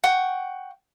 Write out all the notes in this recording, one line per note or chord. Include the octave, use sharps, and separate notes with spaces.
F#5 G5 C#6